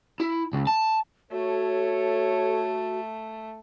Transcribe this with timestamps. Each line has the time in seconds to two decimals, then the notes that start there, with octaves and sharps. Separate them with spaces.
0.20 E4
0.53 C#2
0.67 A5
1.32 A3 F#4 A4 C#5